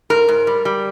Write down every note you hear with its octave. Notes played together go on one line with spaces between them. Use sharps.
G#2 A#4
G#2
G3
G3